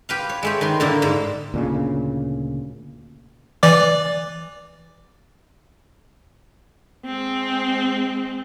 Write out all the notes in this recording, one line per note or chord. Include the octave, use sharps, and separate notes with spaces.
G4 B4 F5
C#5
G#3 A3 G4
D#3 B4 C6
A2 D3 A#3 E4
G#2
D2 A#2 C#3
E3 D5 D6
G#3 C4